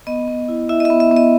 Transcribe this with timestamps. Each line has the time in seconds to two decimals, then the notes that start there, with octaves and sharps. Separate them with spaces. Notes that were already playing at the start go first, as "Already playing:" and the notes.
0.07 B3 D#5
0.28 B3
0.49 E4
0.69 E4 E5
0.80 D#5
0.85 B3 E5
1.00 E5
1.11 B3
1.16 D#5